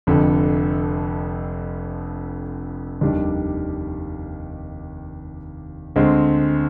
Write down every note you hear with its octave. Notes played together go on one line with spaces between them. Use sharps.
F1 F2 D3
F1 D#2 D#3 G3 D4
D2 D3 G#3 C4